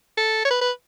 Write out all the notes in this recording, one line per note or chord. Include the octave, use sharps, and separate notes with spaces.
A4
C#5
B4
B4